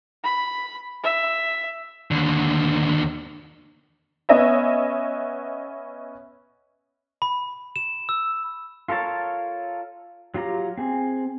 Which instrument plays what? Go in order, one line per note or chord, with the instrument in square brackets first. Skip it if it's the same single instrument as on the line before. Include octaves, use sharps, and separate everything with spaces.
[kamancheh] B5
E5
[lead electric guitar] D#2 D3
[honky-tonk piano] B3 C#4 D#5 E5
[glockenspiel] B5
E7
E6
[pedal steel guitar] F4 A4 A#4 C#5 A5
F#3 F4 G4 A#5
C4 G#4